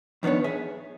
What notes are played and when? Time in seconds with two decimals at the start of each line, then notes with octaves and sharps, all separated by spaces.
0.23 F2 D#3 B3 D4 C#5
0.44 G#4 E5